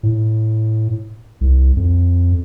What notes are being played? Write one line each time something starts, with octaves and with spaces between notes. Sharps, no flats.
A2
C2
F2